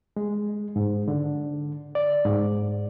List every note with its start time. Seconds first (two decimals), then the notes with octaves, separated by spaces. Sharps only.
0.16 G#3
0.76 G#2
1.08 D3
1.95 D5
2.25 G#2